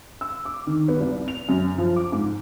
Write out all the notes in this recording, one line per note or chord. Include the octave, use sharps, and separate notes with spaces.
E6
D6
D#3
B3
C2
F7
F#2
F3
D6
G#2